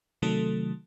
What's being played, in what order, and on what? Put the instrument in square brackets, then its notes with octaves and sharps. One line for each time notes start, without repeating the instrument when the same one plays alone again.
[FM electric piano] C3 D#3 F#3 A3 A4